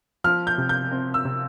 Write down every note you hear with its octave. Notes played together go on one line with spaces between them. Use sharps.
F3 F6
G6
C3
G6
C4
E6
C3